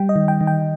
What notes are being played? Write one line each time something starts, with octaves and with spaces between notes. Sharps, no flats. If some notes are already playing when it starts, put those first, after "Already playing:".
Already playing: G3 G5
D#5
D#3
G5
D#3
G5